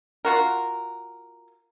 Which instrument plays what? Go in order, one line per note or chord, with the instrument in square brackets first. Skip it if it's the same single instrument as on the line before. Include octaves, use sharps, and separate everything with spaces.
[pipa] F4 F#4 A#4